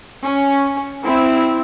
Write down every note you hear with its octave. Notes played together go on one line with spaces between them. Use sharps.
C#4
C4 E4